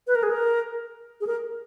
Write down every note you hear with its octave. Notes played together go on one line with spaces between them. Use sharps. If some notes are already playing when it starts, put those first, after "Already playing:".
B4
A#4
G#4
A#4
G#4
A#4